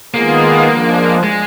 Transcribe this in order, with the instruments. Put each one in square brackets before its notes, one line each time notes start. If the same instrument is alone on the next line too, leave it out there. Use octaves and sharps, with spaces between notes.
[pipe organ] D#3 G#3 B3 F4 G#4 [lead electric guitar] A#3
[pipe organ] F3 G#3 D4
[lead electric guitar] G#3